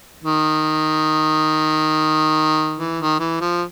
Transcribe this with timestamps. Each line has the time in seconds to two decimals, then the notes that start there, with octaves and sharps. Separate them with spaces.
0.24 D#3
2.78 E3
2.98 D#3
3.19 E3
3.41 F3